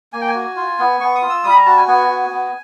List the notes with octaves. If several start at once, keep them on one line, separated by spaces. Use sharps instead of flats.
A#3 G#5
G5
G#5
F#4
F4
B3
B3 C#6
D#6
F4
E6
G3 D#6
B5
A#5
F#4 A5
G#5
B3 G#5
F#4
B3